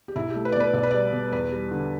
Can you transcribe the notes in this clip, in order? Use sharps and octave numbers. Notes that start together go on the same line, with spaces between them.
G4
B1 E4
G4
A3
B4
D5
B2 B4
B1 D5
B4
G3 D5
B2
E2 B4
G3
D3